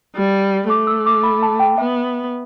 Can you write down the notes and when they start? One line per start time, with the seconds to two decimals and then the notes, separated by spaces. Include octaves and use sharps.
0.15 G3
0.69 A3 D6
0.87 E6
1.06 D6
1.23 B5
1.43 A5
1.59 G5
1.78 B3 E5